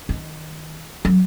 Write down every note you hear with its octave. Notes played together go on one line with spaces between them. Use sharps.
D#3
F#3